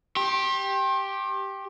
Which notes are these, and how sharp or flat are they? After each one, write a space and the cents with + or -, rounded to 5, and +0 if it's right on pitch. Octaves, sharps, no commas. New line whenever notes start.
G4 +0 C6 +40